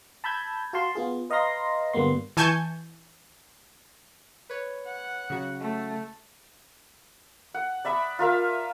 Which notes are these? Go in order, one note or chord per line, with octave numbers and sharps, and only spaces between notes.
A5 B5 E6 G6 G#6
F#4 F5 A5 C6
B3 F4 G#4
B4 D#5 F5 A#5 C6 A#6
G2 D3 G3 A#3 B3 C6
E3 G#5 A5 C#6 G6 G#6
B4 C#5
F#5
C#3 F#3 F#4
A3
F#5
D5 E5 B5 D#6
F4 A#4 E5 F5